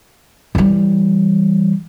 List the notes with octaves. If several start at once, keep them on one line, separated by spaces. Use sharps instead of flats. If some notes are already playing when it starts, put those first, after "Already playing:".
E3 G3